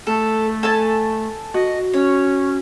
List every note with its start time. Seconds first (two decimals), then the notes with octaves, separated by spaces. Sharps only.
0.07 A3 A4
0.63 A4 G#5 A5
1.54 F#4 D#5
1.93 C#4 C#5